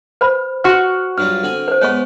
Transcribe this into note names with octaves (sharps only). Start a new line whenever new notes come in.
B4 C5 B5
F#4 F#5 F6
G2 F#3 F4 F6
D3 C4 G#5
B4 C5
G#3 B3 C#5 C#6